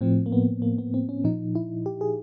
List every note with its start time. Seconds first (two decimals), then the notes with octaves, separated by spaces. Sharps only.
0.01 A2 F3 C4
0.26 A#3
0.32 B3
0.62 A#3
0.78 B3
0.94 C4
1.09 C#4
1.24 A#2 F3 D#4
1.55 E4
1.86 G4
2.01 G#4